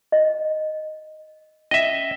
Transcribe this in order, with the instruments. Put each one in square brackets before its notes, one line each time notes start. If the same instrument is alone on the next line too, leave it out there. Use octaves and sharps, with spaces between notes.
[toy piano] D#5
[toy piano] C#4 [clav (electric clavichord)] D#5 E5